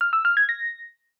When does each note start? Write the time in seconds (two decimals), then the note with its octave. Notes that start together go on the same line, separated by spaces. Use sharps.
0.01 F6
0.13 E6
0.25 F6
0.37 G#6
0.49 A#6